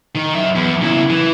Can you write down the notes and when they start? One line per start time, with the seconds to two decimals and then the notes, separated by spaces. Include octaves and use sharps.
0.15 D#3
0.34 F#2 E5
0.55 E2
0.81 C#3 E4
1.10 E3